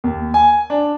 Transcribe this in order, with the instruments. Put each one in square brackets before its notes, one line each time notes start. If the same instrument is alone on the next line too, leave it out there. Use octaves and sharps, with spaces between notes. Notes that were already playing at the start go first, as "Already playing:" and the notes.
[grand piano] D#2
G#5
D4